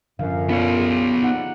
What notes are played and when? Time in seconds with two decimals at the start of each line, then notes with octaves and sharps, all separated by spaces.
0.19 F#2 D3 F3 F5
0.49 B3 C#4 D4 F4 C#5
0.74 G4 G#4
1.23 D#4 F#5